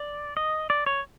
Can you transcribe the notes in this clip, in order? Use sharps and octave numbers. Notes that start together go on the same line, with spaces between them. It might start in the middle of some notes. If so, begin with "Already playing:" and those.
Already playing: D5
D#5
D5
C#5